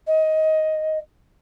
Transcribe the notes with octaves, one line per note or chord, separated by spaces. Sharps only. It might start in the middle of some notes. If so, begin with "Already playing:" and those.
D#5